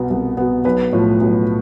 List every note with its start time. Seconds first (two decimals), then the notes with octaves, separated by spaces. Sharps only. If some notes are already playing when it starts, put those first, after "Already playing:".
Already playing: C2 B2 B3
0.10 C2
0.37 B2 B3
0.64 B1 B4
0.93 A2 F3
1.20 B1